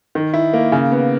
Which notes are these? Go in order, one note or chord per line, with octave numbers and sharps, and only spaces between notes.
D#3
E4
A#3
C#3
B3